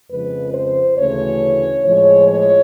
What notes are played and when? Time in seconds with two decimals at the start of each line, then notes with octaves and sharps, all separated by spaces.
0.10 F2 C#3 F3 G#3 B4
0.55 C5
0.98 D2 C#3 E3 A3 C#5
1.85 A2 F3 G#3 C#5
2.28 C#5